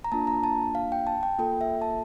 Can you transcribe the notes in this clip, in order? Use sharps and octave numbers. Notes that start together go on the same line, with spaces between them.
A#5
A#3 D4 F4 A5
A#5
A5
F5
G5
A5
G5
A#3 F4 A4 G5
E5
A5